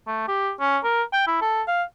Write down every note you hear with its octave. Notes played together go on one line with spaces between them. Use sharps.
A3
G4
C#4
A#4
G5
E4
A4
F5